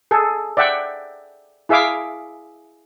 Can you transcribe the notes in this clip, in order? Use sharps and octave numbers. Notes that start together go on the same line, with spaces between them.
G#4 A4
D5 E5 F#5 G5
E4 G#4 E5 F5 D6